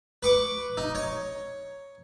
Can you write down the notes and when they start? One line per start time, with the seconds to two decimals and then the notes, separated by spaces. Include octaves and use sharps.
0.23 B4 C#6 D6
0.77 D#4
0.95 C#5